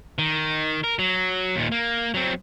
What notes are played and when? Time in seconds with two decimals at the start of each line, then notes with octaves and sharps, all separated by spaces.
0.19 D#3
0.84 A#4
0.99 F#3
1.56 D#2 A#2
1.72 A#3
2.14 F#3 C4